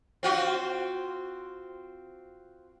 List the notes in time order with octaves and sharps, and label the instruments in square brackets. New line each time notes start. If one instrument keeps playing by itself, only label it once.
[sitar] C4 F4 F#4